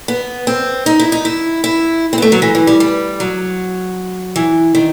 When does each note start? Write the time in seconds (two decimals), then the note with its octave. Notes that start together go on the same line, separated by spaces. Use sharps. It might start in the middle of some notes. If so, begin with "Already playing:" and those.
0.08 B3
0.47 C4
0.86 D#4
0.99 E4
1.12 D#4
1.25 E4
1.64 E4
2.13 C4
2.18 B3
2.22 A3
2.32 F#3
2.42 E3
2.55 E3
2.67 G3
2.80 G3
3.20 F#3
4.36 E3
4.75 D#3